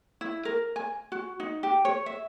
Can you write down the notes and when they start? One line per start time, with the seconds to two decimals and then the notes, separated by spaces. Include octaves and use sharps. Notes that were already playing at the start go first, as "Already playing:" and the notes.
0.21 E4
0.45 A#4
0.76 G#5
1.12 F#4
1.40 D#4
1.63 G4
1.85 C#5
2.06 E5